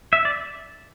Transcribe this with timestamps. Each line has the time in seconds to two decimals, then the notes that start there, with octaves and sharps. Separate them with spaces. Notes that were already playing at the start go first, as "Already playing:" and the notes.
0.13 E5
0.25 D5